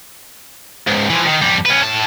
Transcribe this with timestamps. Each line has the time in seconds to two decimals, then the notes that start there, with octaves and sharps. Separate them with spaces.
0.87 C#2 G#2
1.10 E3 F3
1.26 D#3
1.41 F2 G3
1.66 C#4 B4
1.83 A2 A5